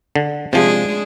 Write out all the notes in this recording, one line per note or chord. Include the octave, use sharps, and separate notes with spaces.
D3
C3 F3 G#3 D4 G#4